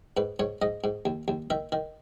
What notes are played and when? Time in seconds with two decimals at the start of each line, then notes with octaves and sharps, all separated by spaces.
0.17 G#2 B4
0.39 G#2 C#5
0.62 G#2 D#5
0.84 G#2
1.05 D#2
1.28 D#2
1.50 D#3 E5
1.72 D#3